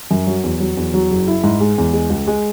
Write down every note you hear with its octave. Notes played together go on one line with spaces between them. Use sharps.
F#2
F#3
E2
F#3
E2
F#3
F#1
E4
G#2
G#3
E2
G#3
C#2
G#3